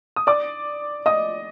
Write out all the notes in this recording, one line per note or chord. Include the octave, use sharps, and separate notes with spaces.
D#6
D5 D6
D#5 D#6